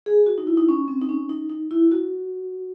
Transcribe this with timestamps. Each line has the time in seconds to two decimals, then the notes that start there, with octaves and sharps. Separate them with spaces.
0.06 G#4
0.26 F#4
0.38 D#4
0.47 E4
0.57 D#4
0.69 C#4
0.88 C4
1.02 D#4
1.09 C#4
1.29 D#4
1.49 D#4
1.71 E4
1.91 F#4